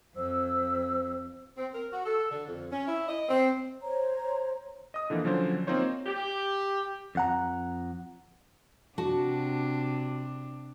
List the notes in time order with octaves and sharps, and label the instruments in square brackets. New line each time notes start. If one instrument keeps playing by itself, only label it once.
[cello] F2 [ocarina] C5 [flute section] E6
[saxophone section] C4
A#4
F#4
A4
D3
F2
C#4
E4
D#5
C4
[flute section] C5 C#5 A#5
[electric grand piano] D#5 D#6
D3 E3 F3 A#3
D3 F3 F#3 C#4 D4 C5
A#3 C4 D#4 F4 C5 C#5
[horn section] G4
[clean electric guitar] F2 F#5 A#5
[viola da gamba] C3 D4 [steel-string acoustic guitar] F#4 A5